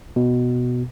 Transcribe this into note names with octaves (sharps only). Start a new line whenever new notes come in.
B2